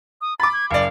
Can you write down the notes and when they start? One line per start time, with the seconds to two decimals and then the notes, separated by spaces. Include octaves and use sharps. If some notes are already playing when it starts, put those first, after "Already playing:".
0.21 D#6
0.40 B5 D6 A6
0.53 G#6
0.71 F#1 D5 F5